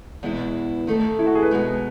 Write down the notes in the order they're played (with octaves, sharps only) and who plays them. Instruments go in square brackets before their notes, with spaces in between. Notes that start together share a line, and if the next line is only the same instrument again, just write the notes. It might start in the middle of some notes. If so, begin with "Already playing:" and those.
[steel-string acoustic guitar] E2 B2 G#3 B3 E4
D#3 A3 D#4 A4
[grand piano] E4
F#4
G#4
B4
[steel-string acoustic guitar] B2 G#3 B3 D#4